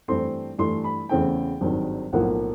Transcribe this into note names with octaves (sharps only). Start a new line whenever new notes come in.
G2 E3 A3 C4 C6
G2 E3 A3 C6
B5
E2 C#3 E3 A3 C4 G5
G#1 G2 D#3 F#3
B1 A2 F3 A#3 F#5